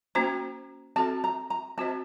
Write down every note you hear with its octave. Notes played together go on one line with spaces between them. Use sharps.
A#3 C#4 F#4 C5 A#5
C4 F#4 A4 A5
A#5
A#5
C4 F#4 C5 D#5 A5